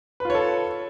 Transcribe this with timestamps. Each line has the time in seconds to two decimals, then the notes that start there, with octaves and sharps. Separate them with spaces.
0.20 B4
0.25 F4
0.30 C#5
0.35 A4